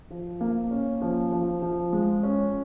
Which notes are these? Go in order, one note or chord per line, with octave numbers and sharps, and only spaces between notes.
F3
A#3
C#4
F3
F3
F3
G#3
C#4